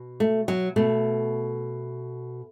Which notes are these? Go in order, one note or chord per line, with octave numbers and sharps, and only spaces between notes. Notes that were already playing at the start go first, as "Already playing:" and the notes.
Already playing: B2
A3
F#3
B2 A3